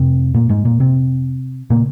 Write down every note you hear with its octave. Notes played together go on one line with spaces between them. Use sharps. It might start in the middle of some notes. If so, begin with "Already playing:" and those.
Already playing: F2 C3 C4
A#2 A#3
G#2 G#3
A#2 A#3
C3 C4
A#2 C#3 A#3